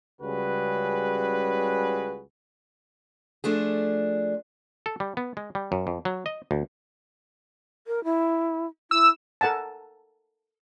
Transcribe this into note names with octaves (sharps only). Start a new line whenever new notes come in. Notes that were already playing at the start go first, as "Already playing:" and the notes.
C#2 C#3 G3 F#4 G#4 B4
F3 A3 D4 G#4
A4
G3
B3
G#3
G3
F#2
F2
F#3
D#5
D2
A#4
E4
E4 E6
A4 A#4 F#5 G#5 A5